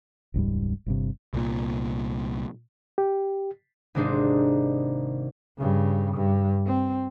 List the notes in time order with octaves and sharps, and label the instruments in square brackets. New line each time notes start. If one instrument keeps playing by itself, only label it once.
[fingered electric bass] E1 C#2 G#2 G3
G1 G2 C3
[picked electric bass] C2 A#2
[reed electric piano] G4
[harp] G#1 C3 G#3 D4 D#4 C5
[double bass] G2 C#3
G2
C4